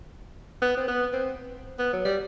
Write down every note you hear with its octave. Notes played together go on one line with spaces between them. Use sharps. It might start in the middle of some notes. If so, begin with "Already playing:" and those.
B3
C4
B3
C4
B3
F#3
G3